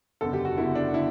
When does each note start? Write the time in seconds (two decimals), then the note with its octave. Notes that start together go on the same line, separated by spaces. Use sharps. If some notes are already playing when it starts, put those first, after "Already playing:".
0.21 F#1 E2 D3 A4
0.33 G4
0.45 F#4
0.58 F#1 E2 D3 E4
0.75 D4
0.94 D3 E4